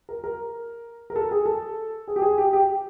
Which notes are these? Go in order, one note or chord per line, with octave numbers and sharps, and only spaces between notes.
A#4
A#4
A#4
A4
G#4
A4
G#4
G4
G#4
G4
G4